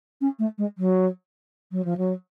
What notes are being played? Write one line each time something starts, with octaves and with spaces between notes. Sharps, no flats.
C#4
A3
G#3
F#3
F#3
F3
F#3